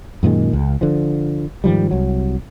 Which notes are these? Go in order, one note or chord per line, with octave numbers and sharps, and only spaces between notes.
F#2 A#2 D#3 G#3
C#2
D3 F3
G#2 D#3 F3 G3
C2 F#3